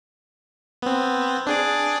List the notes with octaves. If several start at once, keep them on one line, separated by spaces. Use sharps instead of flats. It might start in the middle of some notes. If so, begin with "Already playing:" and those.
B3 C4
D4 G#4 D5